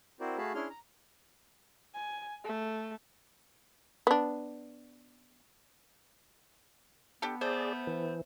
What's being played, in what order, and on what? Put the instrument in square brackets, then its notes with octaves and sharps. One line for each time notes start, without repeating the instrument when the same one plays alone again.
[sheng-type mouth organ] C4 E4 F#4 A#4 C5 D5
A3 F#4 G#4 F5 A5 B5
C#4 D4 E4 G#4 C6 F6
A#5
[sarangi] G#5
A3
[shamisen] B3 D4
[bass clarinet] B3 [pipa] D4 G4 A4
[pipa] A3 [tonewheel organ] G#4 D5 [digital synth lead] C5
[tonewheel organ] E3